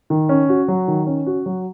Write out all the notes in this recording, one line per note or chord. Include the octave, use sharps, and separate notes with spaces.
D#3
C#4
F#4
F#3
D#3
C#4
F#4
F#3